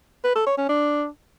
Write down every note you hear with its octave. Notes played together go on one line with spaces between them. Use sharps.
B4
A4
C#5
C#4
D4